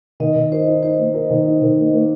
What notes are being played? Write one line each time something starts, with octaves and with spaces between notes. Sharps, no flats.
D#3 D#5
D#3
A#4 C5
D#4
D#4 C5
A#3
A#4
D#3
D#4
D#3
A#3
A#3